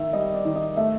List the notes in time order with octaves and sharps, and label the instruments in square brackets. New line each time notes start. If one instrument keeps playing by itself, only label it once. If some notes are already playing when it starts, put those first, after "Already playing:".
Already playing: [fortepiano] D#3 [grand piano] E5
[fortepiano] G3 [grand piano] D#5
[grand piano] D5
[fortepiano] D#3
[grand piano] D#5
[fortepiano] A3 [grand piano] E5